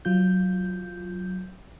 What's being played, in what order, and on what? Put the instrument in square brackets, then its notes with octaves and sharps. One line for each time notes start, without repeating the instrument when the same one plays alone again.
[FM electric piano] F#3 F4 G6